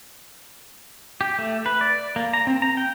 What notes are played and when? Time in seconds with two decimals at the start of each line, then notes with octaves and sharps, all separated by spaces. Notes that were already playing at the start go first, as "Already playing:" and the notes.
1.21 G4
1.39 A3
1.66 B4
1.81 D5
2.16 A#3
2.33 A#5
2.47 C4
2.62 A#5
2.77 G5